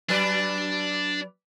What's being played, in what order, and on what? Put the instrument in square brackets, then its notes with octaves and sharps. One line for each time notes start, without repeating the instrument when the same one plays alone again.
[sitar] F#3 B4 D5 [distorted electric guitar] D4